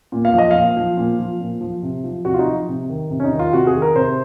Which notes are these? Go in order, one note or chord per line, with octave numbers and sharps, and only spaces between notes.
A#2
F5
F3 D#5
A#2 F5
F3
A#2
F3
A#2
F3
C3
F3
C3 F#4
F4
D#4
F3
C3
D#3
C3
C#4
D#4
D#3
F4
C3 F#4
G#4
D#3
A#4
C3 C5